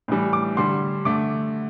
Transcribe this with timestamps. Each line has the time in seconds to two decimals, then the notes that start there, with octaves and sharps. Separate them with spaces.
0.08 A2 E3 G3
0.33 D6
0.57 D3 G3 C6
1.05 D3 A3 D6